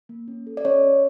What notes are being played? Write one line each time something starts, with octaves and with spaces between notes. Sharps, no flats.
A#3
C#4
A4
D5
C#4 C#5 D#5
C#4